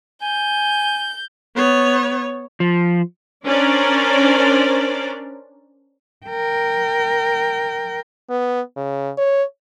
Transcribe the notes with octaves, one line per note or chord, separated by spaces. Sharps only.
G#5 G6
B3 C#5
F3
C#4 D4 A#4 C5 D5
A#4 G5
B3
C#3
C#5